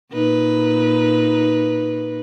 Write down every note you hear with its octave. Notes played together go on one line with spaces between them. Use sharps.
A#2 D#4 B4